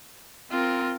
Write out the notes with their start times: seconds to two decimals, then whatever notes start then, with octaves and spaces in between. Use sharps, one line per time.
0.51 C4 F4 A#4